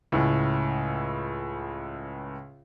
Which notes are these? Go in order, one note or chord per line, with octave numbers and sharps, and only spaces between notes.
C#2 A2